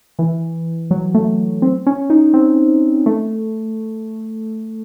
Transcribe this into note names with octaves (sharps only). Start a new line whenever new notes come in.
E3
F#3
A3
C4
C#4
D#4
C4
A3